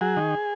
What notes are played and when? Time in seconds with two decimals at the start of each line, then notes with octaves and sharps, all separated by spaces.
0.01 F#3 G#4
0.17 D#3